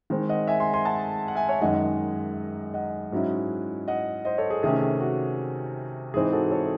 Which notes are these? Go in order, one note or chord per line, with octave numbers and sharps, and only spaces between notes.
D#3 G#3 C4
D#5 F#5
E5 G#5
G#5 C6
G#5 C6
F#5 A5
F#5
E5 G#5
C#5 E5
F#2 D#3 G#3 D#4 D#5 F#5
D#5 F#5
G#2 F#3 C#4 E4
D#5 F#5
C5 D#5
A4 C#5
G#4
C3 D#3 A3 C#4 G#4
G#4
F#4
G#2 E3 C4 D#4 G#4
F#4 A4
A4 C#5